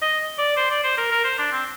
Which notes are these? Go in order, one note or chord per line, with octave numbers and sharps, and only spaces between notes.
D#5
D5
C5
D5
C5
A#4
A#4
C5
D4
C4